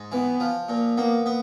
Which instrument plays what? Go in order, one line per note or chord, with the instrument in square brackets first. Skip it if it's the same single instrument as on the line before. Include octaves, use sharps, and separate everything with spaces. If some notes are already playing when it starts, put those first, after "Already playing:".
Already playing: [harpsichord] G#2
[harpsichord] E3 [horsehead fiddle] B3
[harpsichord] F3
A#2
[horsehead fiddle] A#3 [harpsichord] B3
[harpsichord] B3